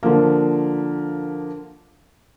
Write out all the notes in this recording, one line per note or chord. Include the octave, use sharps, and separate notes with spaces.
D3 F3 A#3